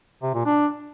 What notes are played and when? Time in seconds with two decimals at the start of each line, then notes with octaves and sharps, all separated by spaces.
0.23 C3
0.34 A#2
0.46 D4